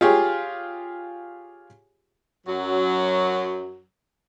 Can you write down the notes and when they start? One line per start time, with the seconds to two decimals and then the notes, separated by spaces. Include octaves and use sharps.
0.01 F4 G4 G#4 C#5
2.47 F#2 F#3